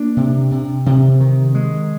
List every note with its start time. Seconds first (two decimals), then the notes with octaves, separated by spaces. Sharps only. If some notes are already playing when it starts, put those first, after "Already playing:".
Already playing: A#3 D4
0.17 C3
0.51 C3
0.86 C3
1.20 D#3
1.55 G#3